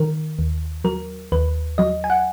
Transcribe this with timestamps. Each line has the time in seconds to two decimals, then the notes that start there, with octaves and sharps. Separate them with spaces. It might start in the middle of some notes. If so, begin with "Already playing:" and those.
Already playing: D#3 A#4
0.39 D#2
0.84 F#3 A#4
1.32 D#2 B4
1.78 F#3 D#5
2.04 G#5
2.10 F#5